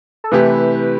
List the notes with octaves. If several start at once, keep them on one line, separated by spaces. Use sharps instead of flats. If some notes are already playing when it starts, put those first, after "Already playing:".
A4
C3 E3 A3 E4 G4 B4